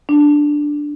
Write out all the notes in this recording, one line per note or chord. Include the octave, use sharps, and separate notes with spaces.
D4